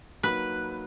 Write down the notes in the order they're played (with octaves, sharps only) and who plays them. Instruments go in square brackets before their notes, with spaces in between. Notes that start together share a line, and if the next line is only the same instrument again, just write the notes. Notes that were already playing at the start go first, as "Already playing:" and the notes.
[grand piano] F#3 A#3 D#4 F#4 A#4 [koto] B4